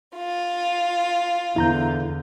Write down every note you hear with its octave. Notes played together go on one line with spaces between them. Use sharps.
F4
E2 D3 E4 A#5 G6